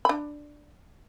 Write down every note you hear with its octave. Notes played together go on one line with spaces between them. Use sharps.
D4 B5